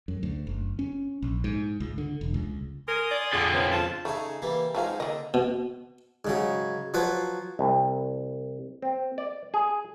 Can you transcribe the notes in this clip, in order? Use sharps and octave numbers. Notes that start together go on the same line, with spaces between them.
F#2
D2
F#1
C#4
A#1
G#2
C#2
D3
E1
C#2
A#4 G#5 C6 D#6
D5
F2 D3 G#4
B3 C#4 C5
F4 C5 A5
C#3 A3 D#4 G#4
E3 G3 A#3
F3 F#3 G#3 D#4 F4 F5
D3 A#3 D#5
B2
G#2 C#3 F#3
F3 F#3 B4 C5
C2
C4
D5
G#4